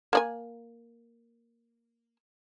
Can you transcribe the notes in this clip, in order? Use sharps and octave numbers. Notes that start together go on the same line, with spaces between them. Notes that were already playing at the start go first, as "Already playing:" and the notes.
A#3 D5 G#5